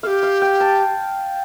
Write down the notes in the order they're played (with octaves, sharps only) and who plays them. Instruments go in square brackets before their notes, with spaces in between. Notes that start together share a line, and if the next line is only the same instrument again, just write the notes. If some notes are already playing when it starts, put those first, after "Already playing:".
[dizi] G4 A4 [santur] F5
[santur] F5
G5
A5